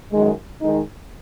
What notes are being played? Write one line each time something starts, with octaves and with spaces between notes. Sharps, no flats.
F#2 D#3 G#3
D#3 G#3 D#4